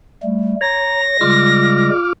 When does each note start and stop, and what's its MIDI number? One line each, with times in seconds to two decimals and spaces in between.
0.23 0.56 55
0.23 0.56 57
0.61 1.17 73
0.61 1.01 82
0.61 1.90 94
1.21 1.90 49
1.21 1.90 55
1.21 1.90 56
1.21 2.13 65
1.21 2.13 86
1.21 2.13 89